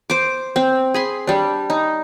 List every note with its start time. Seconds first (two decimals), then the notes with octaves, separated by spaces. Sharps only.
0.10 C5 D6
0.56 C4
0.94 G#4 B5 C6
1.27 G3 D4
1.70 D#4